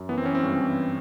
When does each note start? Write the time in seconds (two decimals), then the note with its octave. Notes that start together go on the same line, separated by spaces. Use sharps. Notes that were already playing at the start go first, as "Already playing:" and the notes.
Already playing: F#2
0.09 E3 B3
0.18 C4
0.26 E3 C#4
0.35 C4
0.43 G2
0.61 E3